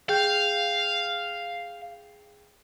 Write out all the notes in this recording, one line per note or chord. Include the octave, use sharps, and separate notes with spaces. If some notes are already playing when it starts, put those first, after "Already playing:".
G#4 F5 G5 G6